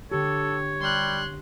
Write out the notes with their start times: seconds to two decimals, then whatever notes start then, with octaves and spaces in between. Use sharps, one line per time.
0.12 D3 G4 A4 C#5
0.81 G3 C6 F#6